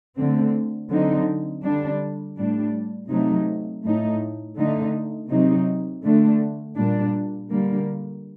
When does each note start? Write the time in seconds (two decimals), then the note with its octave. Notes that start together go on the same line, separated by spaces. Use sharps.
0.17 D3 A3 C4
0.89 D3 F#3 C4 D#4
1.63 D3 G3 D4
2.37 A2 G3 D4
3.10 C3 F#3 A3 D#4
3.84 A2 A3 D#4
4.57 D3 A3 D#4
5.30 C3 F#3 C4 D#4
6.04 D3 A3 D4
6.77 A#2 G3 D4
7.51 D3 G3 A#3